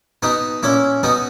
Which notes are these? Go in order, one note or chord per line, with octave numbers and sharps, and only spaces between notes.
B2 B3 D#4
A#2 C#4 E4
B2 B3 D#4